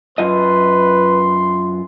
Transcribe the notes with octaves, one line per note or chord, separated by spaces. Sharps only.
F#2 F4 B4 D#5 C6